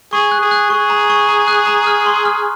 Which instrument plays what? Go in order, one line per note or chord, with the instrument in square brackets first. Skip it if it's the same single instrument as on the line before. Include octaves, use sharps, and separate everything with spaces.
[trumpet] G#4 [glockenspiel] C#6
[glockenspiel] F#6
[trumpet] G#4
[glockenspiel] F#6
[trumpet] G#4 [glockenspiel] C#6
[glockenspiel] A#5
C#6
A#5
F#6
A#5
F6
C6
F6